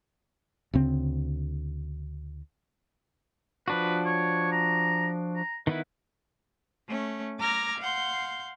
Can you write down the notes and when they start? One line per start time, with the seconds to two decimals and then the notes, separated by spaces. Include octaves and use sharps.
0.74 D2 C#3 C4
3.68 F3 D4 F#4 B4
4.05 C#5
4.52 A#5
5.36 A#5
5.67 D#3 B3 E4 B4
6.89 A3 C#4
7.40 A#5 D6 F6 G#6 A#6
7.80 F5 F#5 C6 G6